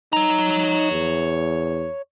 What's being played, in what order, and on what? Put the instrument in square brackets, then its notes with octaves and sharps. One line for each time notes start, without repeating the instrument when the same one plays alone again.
[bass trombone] D#4 [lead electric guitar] C#5 A#5
[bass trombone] E2